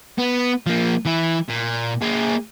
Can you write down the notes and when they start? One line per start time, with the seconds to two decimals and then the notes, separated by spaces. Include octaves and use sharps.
0.19 B3
0.66 F3 A#3
1.05 E3 E4
1.49 A#2
2.02 A#3 G#4